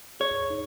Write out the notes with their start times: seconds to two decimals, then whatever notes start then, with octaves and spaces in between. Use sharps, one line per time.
0.20 G#4 C#5
0.50 D#4